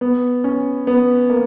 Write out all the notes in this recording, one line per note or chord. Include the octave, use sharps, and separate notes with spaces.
B3
C#4
B3
A#3